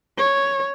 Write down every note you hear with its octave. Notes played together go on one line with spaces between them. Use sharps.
C#5